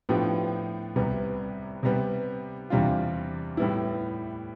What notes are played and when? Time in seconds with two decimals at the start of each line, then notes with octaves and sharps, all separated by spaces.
0.09 A2 F3 B3 D4 G4
0.96 C2 C3 G3 B3
1.83 C3 G3 B3
2.70 E2 C3 G3 D4 F4
3.57 A2 G3 B3 E4